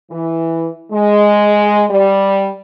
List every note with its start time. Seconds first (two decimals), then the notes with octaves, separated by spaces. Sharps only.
0.11 E3
0.92 G#3
1.90 G3